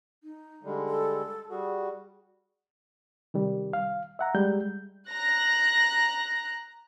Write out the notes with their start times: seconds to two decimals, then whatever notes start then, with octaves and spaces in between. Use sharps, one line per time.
0.24 D#4
0.63 D3 G3 G#3
0.89 A4
1.50 G3 F#4 G#4
3.34 C3 D#3 G3
3.73 F5
4.19 E5 F#5 A#5
4.34 G3 G#3 G6
5.09 A#5 F#6 A#6